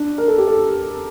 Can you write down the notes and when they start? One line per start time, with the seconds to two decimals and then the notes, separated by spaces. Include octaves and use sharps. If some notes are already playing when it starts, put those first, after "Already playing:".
Already playing: D4
0.18 A#4
0.28 A4
0.38 G4
0.47 A4